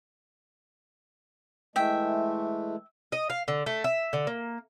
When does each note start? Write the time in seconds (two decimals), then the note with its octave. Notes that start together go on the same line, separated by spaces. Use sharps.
1.76 E3 G#3 A3 E5 G5
3.12 D#5
3.30 F5
3.48 D3
3.66 A3
3.84 E5
4.13 D3
4.27 A#3